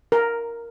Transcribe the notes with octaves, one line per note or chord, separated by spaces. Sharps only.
A#4